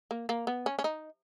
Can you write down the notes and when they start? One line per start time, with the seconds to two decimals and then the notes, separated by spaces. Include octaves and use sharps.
0.11 A#3
0.29 A#3
0.47 B3
0.66 C#4
0.79 C#4
0.84 D#4